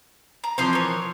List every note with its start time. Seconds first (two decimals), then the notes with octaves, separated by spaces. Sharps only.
0.44 A#5
0.58 E3 F3 C4 C5 A#5 C6
0.73 A#3 C#5